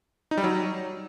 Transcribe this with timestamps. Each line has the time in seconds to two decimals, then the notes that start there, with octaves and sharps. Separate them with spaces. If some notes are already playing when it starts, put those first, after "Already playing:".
0.31 D#4
0.38 G3
0.44 F#3